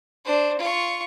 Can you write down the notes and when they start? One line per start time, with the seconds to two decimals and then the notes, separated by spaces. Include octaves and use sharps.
0.24 D4 C5
0.58 F4 C#6